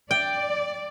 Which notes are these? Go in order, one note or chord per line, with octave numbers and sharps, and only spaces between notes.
D5 G5